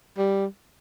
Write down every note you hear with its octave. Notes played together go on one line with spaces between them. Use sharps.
G3